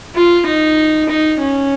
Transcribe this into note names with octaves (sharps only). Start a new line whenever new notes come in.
F4
D#4
D#4
C#4